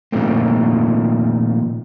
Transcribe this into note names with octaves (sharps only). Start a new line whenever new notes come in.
A#2 D#3 F3 A3 A#3 C4